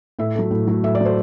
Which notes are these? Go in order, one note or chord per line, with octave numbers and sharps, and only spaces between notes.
A2 E5
F#3 A3
A2
F#3 A3
A2 E5
D5
F#3 A3 C5